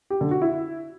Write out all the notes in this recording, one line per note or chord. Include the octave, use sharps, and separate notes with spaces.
G4
D3
F#4
E4